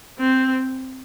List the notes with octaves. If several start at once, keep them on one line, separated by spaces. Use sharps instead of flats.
C4